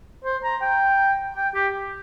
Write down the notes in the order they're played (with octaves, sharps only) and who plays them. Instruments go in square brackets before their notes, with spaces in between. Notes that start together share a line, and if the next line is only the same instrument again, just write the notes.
[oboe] C5
A#5
G5
G5
G4